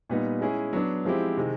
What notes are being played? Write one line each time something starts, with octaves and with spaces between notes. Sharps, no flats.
A#2 G3 B3 D#4
G#3 C#4 E4 G#4
F#3 B3 D4
F3 G#3 C4 E4 G4
C3 D#3 G#3